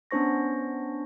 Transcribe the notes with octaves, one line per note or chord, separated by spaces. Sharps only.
B3 C#4 D4 C5 C#6 A#6